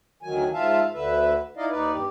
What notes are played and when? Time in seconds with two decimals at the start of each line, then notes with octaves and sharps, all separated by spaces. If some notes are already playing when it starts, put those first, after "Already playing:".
0.23 D2 D#3 F#3 G#5
0.53 G#2 F4 E5 F5 A5
0.94 D2 D3 B4 E5
1.57 D#4 E4 D5 D#5 F5
1.70 D#2 D#4 B4 D5
1.92 G2 G4